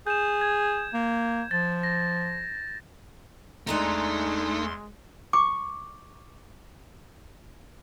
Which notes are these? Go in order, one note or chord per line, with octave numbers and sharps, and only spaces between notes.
G#4 G6 E7
G#6
A#3
F3 A6
A#6
E2 G#3 A3 D4 D#4 A#5 C6
C#6 D6